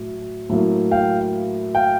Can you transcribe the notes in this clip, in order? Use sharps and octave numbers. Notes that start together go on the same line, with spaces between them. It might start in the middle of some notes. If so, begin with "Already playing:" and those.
Already playing: A2 F#3
A2 F#3 A#3
F5 G5
F5 G5